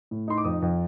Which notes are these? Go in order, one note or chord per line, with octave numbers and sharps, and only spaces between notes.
A2
D#4 C6
D6
F2 D#6
F2